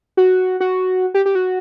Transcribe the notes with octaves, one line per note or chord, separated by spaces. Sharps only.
F#4
F#4
G4
G4
F#4